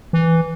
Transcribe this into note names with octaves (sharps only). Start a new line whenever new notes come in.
E3